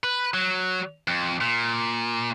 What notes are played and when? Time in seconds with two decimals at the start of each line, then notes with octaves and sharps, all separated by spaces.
0.03 B4
0.34 F#3
1.08 F2
1.41 A#2